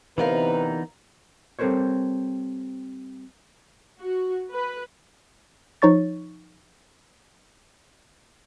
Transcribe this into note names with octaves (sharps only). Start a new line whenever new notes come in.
D2 C3 E3 B3 D#4 A#4 B4 F5
G3 C4 A4 A#4 C5 C#5
F#4
B4
F3 D#4 C#5 C#6 A6